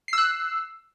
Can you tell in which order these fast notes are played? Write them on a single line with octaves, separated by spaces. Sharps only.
C7 E6 F#6